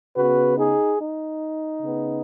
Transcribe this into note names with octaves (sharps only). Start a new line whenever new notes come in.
C#3 B3 F#4 B4
D#4 G#4
D#4
C#3 B3